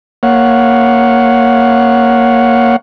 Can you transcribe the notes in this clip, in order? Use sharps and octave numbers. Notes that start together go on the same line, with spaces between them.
A#3 C#5 F5 F#5